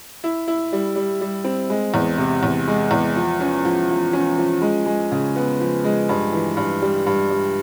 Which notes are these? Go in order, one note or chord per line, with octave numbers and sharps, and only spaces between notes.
E4
E4
G3
G3
G3
C4
G#3
E2
C3
E2
G#3
E2
F3
C#4
F3
F3
C#4
F3
G#3
G#3
C#3
B3
F3
G#3
G2
E3
G2
G3
G2
G3